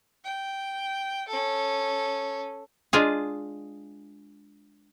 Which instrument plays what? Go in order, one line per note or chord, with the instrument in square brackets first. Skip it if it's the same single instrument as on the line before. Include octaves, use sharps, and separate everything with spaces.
[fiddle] G5
C#4 A4
[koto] G#3 D4 F4 G#4